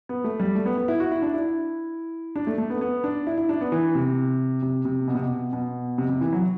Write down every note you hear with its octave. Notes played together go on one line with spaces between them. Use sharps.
B3
A3
G3
A3
B3
B3
E4
F#4
E4
D4
E4
D4
A3
A3
B3
B3
D4
E4
E4
D4
B3
E3
C3
C3
C3
B2
C3
B2
B2
C3
C3
E3
F#3